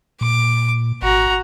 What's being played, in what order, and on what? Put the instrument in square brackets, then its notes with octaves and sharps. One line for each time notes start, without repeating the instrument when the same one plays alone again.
[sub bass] A#2 [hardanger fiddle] D6
[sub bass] G#1 [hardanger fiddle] F#4 A#5